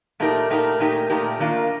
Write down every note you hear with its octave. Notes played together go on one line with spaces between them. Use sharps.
A#2 A3 D#4 G4 A#4
A#2 A3 D#4 G4 A#4
A#2 A3 D#4 G4 A#4
A#2 A3 D#4 G4 A#4
D#3 A#3 D4 F4 A#4